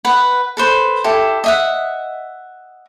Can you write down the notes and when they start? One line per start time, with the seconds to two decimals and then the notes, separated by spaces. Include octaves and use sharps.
0.05 B4 F#5
0.57 A4 B4 C5
1.04 E4 G4 A4
1.44 D#5 E5 F#5